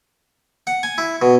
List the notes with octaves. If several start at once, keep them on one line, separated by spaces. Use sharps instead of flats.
F#5
G#5
E4
B2